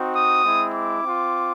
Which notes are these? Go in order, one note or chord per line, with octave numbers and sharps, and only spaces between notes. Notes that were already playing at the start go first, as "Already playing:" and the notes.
Already playing: C4 D#4 F#4
D#6
G#3 C4 E4
D6
C4 F4